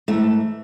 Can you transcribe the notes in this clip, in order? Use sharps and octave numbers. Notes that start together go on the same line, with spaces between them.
G#2 E3 A3